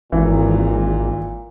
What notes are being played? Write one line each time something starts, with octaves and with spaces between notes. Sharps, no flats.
G#1 A#2 E3